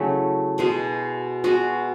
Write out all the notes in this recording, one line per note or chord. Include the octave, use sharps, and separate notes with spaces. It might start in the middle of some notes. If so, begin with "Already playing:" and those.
Already playing: C#3 F#3 A3 E4
B2 G#3 B3
B2 G#3 B3 F#4